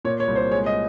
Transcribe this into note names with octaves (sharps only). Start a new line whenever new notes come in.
A#2 C#5
C#5
C2
C5
G#3 C#5
D#5